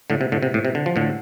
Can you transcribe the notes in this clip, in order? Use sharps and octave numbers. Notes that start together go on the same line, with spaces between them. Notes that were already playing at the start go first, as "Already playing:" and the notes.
A2 D3
C3
A2 D3
C3
A2
C3
D3
F3
A2 D3